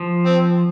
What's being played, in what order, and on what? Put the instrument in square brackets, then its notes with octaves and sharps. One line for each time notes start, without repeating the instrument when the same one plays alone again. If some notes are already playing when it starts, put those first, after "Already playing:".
Already playing: [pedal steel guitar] F3
[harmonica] C4